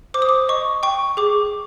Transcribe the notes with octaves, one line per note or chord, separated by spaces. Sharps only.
C5 D6
D#6
D6
D#5 C#6
G5 C#6
G#4 D6